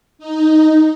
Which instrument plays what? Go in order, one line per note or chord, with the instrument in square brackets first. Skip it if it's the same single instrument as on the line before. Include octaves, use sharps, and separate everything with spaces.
[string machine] D#4